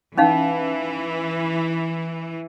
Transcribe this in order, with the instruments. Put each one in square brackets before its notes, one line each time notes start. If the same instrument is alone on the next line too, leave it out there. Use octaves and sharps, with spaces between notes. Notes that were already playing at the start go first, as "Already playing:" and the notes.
[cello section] E3 [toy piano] C#4 D#4 F5